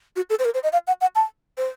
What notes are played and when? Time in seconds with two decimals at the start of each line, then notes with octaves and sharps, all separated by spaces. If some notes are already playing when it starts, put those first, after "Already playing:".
0.16 F#4
0.30 A4
0.39 C5
0.45 A#4
0.54 C5
0.63 D#5
0.73 F5
0.87 F#5
1.01 F#5
1.15 A5
1.58 C5